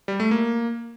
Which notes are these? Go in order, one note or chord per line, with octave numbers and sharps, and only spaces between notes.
G3
A3
A#3